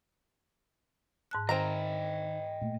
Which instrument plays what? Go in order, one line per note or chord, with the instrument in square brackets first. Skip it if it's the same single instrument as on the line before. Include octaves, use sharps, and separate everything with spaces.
[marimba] G#2 A5 F#6
[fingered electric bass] D#3 [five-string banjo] C4 A#4 A#5 [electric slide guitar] D#5 G5 G#5
[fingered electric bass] A#2 A3